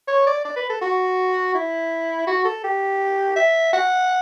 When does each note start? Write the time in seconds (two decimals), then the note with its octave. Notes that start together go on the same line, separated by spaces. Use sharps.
0.08 C#5
0.27 D5
0.45 D5
0.56 B4
0.70 A4
0.82 F#4
1.54 E4
2.27 F#4
2.45 A4
2.64 G4
3.36 E5
3.73 F#5